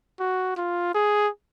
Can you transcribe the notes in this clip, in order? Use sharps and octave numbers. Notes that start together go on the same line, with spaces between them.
F#4
F4
G#4